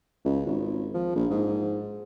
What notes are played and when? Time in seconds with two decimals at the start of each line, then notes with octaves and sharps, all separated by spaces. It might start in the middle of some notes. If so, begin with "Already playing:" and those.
0.25 C#2
0.46 G#1
0.94 F3
1.16 A#1
1.30 G#2